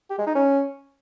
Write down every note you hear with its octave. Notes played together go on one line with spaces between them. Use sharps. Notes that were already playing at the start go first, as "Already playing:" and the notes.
G4
G#3
D#4
C#4